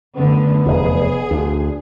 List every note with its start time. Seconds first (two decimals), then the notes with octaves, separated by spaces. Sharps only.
0.17 F#2 D3 A3 B3
0.66 F1 E2 G#4
1.31 D2